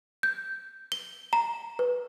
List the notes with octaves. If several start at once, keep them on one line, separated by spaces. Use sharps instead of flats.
G6
G7
A#5
B4